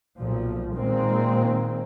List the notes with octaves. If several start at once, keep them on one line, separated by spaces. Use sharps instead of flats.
B1 A#2 F3
A#2 D#3 G#3 A#3 C4